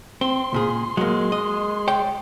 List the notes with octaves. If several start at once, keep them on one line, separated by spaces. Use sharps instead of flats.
C4 C6
C#2 A#2 G#4
F#3 G#3 A#3
D#5
C#5 D5 G5